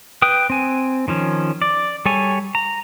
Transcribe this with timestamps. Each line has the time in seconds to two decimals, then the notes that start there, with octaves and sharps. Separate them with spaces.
0.22 B4 G5 D#6
0.50 C4 G#5
1.08 D#3 F3 C#4
1.62 D5
2.05 G3 G#4 A4 C#5 G#5
2.55 A#5